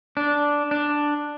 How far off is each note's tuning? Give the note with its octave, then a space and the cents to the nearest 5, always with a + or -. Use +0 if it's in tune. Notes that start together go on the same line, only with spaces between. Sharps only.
D4 -5
D4 +5